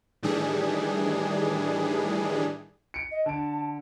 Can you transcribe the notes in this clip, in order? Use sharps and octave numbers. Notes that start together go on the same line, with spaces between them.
A2 D#3 E3 G3 D4 G#4
C#7 D7
D#5
D3 A5 D7